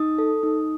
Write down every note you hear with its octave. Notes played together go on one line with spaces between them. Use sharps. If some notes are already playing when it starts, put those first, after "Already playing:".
Already playing: D#4 D#6
A4
D#4